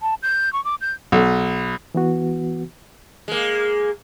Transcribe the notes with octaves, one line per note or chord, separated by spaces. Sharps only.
A5
G6
C#6
D6
G6
B1
E3 B3 F#4
G#3 A#3